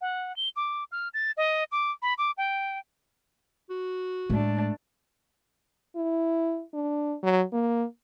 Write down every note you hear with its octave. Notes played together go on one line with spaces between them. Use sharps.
F#5
G7
D6
F6
A6
D#5
D6
B5
D6
G5
F#4
A2 G#3 A3 D4
E4
D4
F#3
A#3